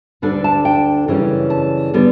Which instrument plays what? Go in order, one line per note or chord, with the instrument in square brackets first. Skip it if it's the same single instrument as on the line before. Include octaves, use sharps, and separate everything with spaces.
[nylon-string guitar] D2 D3 G3 D4 B4
A5
G5
F#2 C#3 E3 G3 C#4
A5
D3 G3 B3